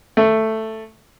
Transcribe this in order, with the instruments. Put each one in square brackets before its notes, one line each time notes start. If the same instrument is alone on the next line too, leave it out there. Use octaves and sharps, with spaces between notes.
[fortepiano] A3